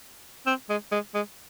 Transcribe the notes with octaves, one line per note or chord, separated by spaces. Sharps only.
C4
G#3
G#3
G#3